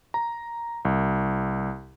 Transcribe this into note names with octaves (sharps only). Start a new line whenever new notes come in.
A#5
C2